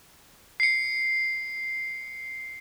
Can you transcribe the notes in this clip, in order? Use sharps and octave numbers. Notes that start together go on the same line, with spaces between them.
C7 C#7